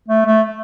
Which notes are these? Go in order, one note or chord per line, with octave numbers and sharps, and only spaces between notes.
A3
A3